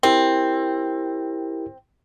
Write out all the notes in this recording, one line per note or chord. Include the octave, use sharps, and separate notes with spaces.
C4 E4 G4 A#4